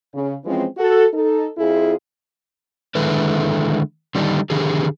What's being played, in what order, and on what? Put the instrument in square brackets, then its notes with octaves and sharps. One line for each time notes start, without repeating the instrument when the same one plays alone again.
[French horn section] C#3
E3 F3 G#3 C4 C#4
F#4 A4
D#4 A4
F2 E4 F4 G#4
[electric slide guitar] D3 D#3 G#3 E4 A4 B4
D3 D#3 G3 D4 D#4
D3 D#3 G4 G#4